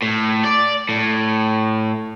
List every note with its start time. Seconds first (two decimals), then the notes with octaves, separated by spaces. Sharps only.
0.03 A2
0.45 D5
0.89 A2